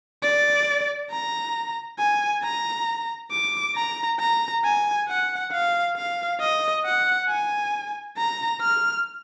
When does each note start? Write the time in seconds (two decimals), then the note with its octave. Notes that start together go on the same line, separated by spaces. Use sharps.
0.23 D5
1.11 A#5
1.99 G#5
2.43 A#5
3.31 D6
3.75 A#5
4.20 A#5
4.64 G#5
5.08 F#5
5.52 F5
5.96 F5
6.40 D#5
6.85 F#5
7.28 G#5
8.17 A#5
8.61 F6